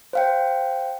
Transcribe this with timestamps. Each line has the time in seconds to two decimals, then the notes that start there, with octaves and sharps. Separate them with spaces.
0.13 C5 F5 G5